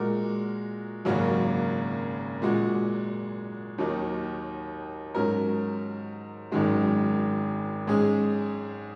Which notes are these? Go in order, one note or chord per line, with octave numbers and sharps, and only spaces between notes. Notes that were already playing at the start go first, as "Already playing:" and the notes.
Already playing: A#2 G#3 F#4 A#4
G#1 F#2 C#3 A#3 F#4
A#2 G#3 F#4
D#2 D#3 F#3 D#4
G#2 F#3 C#4 A#4
G#1 F#2 D#3 G#3 F#4
G#2 G#3 C#4 G#4